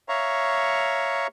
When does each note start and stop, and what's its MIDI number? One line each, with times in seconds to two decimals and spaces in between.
0.09 1.27 73
0.09 1.27 76
0.09 1.27 77
0.09 1.27 82
0.09 1.27 85